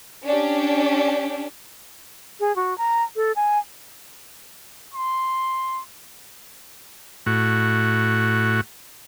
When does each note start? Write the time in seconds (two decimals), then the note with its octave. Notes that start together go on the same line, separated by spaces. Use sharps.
0.25 C#4 D4 G4
2.40 G#4
2.56 F#4
2.78 A#5
3.16 A4
3.36 G#5
4.94 C6
7.26 A2 F#4